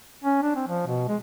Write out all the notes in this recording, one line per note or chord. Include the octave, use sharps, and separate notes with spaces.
C#4
D4
C4
F3
B2
G#3